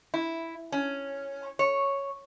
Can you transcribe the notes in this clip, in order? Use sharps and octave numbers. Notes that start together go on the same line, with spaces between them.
E4
C#4
C#5